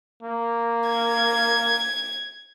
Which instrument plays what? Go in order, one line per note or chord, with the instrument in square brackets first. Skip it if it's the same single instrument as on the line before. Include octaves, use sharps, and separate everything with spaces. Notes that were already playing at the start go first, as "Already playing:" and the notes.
[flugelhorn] A#3
[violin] G#6